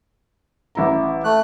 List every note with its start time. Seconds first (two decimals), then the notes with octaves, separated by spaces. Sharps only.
0.75 A1 E4 A#5
1.24 A3 F#6